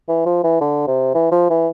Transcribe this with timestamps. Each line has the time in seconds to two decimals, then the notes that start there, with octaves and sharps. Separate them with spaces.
0.09 E3
0.26 F3
0.44 E3
0.61 D3
0.87 C3
1.14 E3
1.32 F3
1.50 E3